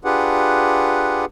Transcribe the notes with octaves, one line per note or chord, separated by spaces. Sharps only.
D4 F4 G4 G#4 B4 F#5